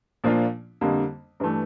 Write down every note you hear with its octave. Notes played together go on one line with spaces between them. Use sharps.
A#2 F3 A#3 D4 F4
F2 D3 G3 A#3
G2 E3 A3